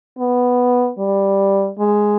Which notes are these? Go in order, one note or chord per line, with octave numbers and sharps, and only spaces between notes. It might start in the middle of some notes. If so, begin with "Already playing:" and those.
B3
G3
G#3